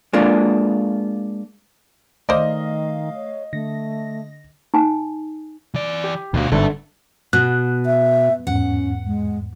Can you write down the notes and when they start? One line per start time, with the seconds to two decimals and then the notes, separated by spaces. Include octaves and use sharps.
0.13 G#3 A#3 D4 F4
2.29 D#3 A3 C5 D5 D#5 F5
3.14 C#5
3.53 D3 A3 A#6
4.74 D#4 G#5
5.74 E3 D5
6.04 G4
6.34 D2 B2 F5
6.52 G1 G#2 D3 A4 E5
7.33 B2 F#6
7.86 E5
8.47 E2 G#2 C#4 F#5
9.06 G#3